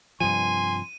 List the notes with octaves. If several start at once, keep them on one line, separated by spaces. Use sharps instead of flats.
G2 C3 F3 G#5 C6 D#7